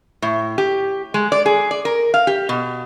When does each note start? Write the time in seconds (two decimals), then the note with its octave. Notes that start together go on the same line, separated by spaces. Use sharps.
0.22 A2
0.58 G4
1.14 G#3
1.32 D5
1.46 G#4
1.71 D5
1.85 A#4
2.14 F5
2.27 G4
2.49 B2